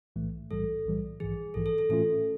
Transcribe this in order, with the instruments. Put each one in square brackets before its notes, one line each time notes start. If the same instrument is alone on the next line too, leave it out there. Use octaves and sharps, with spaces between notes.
[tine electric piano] B1 A2 E3 A3
[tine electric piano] B1 A2 E3 G3 [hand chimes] A4
[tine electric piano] B1 A2 E3 G3
[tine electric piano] A#1 G#2 E3 [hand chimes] G#4
[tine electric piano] A#1 G#2 E3 [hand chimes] A4
[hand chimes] A4
A4
[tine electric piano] A2 E3 A3 C#4 F4 [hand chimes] A4